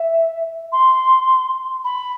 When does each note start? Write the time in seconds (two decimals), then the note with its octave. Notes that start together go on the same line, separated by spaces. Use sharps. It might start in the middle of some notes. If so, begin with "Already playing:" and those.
Already playing: E5
0.72 C6
1.85 B5